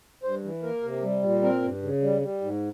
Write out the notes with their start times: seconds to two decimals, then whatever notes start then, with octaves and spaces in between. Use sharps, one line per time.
0.23 G2 C5
0.44 E3
0.63 A#3 A#4
0.83 C3
1.03 G3
1.23 A#2
1.43 C4 A#4
1.62 G2
1.82 C#3
2.02 G3
2.21 G3
2.41 G#2